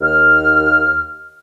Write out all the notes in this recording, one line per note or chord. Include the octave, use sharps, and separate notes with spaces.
D#2 F6